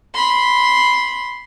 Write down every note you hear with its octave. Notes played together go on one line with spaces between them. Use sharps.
B5 C6